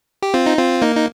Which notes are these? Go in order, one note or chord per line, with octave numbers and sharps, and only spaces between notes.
G4
C4 F4
D#4
C4 F4
A#3 D#4
D#4